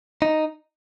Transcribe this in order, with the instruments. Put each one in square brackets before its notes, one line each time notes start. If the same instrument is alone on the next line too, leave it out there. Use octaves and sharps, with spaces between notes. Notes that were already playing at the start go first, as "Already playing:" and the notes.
[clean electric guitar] D#4